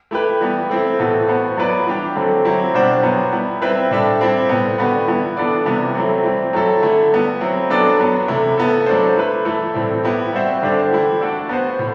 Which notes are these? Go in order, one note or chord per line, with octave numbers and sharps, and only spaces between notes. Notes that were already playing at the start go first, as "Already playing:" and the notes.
A3 E4 G4 B4
E3 G3 B3
A3 C4 E4
A2 E3 B3 F#4 A4
B3 F#4 C5
F#3 B3 E4 B4 D5
E3 G3 D4 G4
D3 F#3 A3 C4
F#3 C4 E4 G4
B2 G3 D4 F#4 C5
F#3 B3 E4
G3 B3 E4
G3 C4 E4 B4 E5
A2 G3 D4 A4 E5
G3 C4 E4 G4
A2 G3 B3
D3 G3 B3 F#4 B4
E3 G3 B3 E4
E3 B3 D4 A4 D5
C3 E3 G3 B3
F#3 A3 C4 E4
E3 G3 C4
F#3 A3 E4 A4
D3 A3 E4
G3 B3 E4
F#3 C4 E4
F#3 B3 D4 A4 D5
F#3 B3 D4
C3 E3 A3 E4
B3 E4 A4
F#3 A3 D4 A4 C5
A3 E4 B4
E3 A3 E4 A4
A2 E3 G3 C4
B3 E4 G4
G3 C4 F#4 C5 E5
D3 G3 D4 G4 C5
E3 A3 E4
A3 D4 F#4 A4 D5
B3 F#4 C5
A2